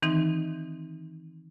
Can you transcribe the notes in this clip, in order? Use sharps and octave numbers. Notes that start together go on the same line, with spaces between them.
D#3 E3 C4 D#4